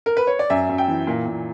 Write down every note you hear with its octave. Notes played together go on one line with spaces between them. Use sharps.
A#4
B4
C#5
D5
F#2 E5
F#2
G5
E3
A#2
A#2